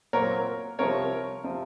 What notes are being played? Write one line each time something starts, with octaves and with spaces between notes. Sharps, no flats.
A#2 F#3 C4 A#4 C#5
C2 C3 F3 A#4 C#5
C3 F3